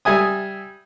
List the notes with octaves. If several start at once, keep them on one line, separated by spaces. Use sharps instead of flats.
G3 E5 G#5 D#6